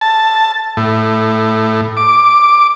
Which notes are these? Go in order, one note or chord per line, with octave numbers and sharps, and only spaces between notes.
A5
A2
D6